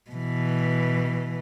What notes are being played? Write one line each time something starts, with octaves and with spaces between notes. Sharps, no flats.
B2 E3